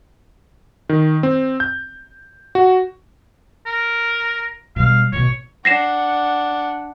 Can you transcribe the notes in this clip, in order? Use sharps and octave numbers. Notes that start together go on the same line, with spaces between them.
D#3
C4
G6
F#4
A#4
B2 G3 F5
A1 B2 C#5
D4 F#5 A#6 C7 E7